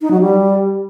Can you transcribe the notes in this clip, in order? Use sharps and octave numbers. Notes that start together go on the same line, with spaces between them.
D#4
F#3
G3